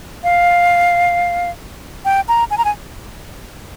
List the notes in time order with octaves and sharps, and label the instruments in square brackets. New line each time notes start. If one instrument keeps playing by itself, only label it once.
[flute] F5
G5
A#5
G#5
A#5
G#5